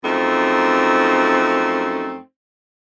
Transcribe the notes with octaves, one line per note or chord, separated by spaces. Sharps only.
F#2 F3 A3 C4 D#4